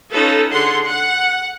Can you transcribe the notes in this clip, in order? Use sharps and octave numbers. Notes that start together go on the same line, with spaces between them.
C#4 D#4 F4 A4 B4
D3 G#4 F#5 C6
F#5